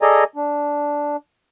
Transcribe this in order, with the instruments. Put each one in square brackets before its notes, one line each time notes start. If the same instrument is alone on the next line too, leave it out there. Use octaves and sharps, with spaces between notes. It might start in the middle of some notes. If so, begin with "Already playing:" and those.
[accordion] G#4 A4 D5 D#5 G#5 A#5
D4